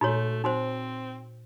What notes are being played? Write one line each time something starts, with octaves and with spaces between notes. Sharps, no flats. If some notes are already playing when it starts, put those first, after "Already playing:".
A#2 A3 D#4 F#4 C#5
C4 D#4 F#4 C5